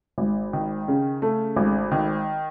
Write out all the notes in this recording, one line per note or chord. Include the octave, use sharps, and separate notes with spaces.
G#1
D#3
C#3
A3
G#1
D#3